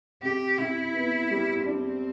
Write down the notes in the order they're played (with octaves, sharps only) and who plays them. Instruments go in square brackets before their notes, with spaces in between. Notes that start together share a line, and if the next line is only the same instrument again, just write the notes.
[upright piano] C3 [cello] G4
[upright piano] C3 [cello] E4
[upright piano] B3
G3
[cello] C4 [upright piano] D4